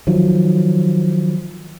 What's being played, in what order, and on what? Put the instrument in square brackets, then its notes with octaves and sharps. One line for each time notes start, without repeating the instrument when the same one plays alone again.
[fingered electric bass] D#3 F3 F#3